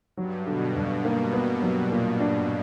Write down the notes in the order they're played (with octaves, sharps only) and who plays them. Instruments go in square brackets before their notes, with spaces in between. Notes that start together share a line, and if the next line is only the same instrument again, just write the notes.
[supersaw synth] G2 [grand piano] F#3
[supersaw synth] B2 [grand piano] D3
[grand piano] G2
A#3
B3
F#3
A#2
D4